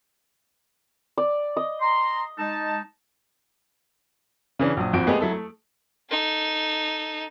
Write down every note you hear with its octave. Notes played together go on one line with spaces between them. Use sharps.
D5
D#5
A#5 C6
G#3 D#4 A5
C#3 E3 C#4 D4
A#1 F#3 D#6
G#1 F2 F3 F#4 D7
G#3 A3 B3 G4 G#4 D#5
F#3 E4 A4
A3
D#4 A4